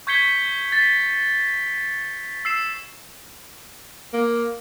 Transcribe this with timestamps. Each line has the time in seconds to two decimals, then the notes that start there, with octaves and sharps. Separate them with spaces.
0.07 C#6 G6 G#6 B6 C#7 G7
0.72 A6 B6
2.45 E6 C7 E7
4.13 A#3